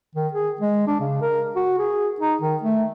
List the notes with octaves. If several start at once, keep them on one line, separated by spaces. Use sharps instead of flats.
D#3
G#4
G#3
D4
C#3
A#4
F#4
G#4
D#4
D#3
A3